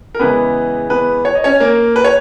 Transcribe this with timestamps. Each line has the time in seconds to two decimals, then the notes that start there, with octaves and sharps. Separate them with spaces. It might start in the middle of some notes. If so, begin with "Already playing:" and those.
0.15 A#4
0.19 E2 C#3 E3 G#3 B3 B4
0.90 B3 B4
1.25 C#5
1.35 D#5
1.44 C#4 C#5
1.60 A#3 A#4
1.96 B4
2.04 C#5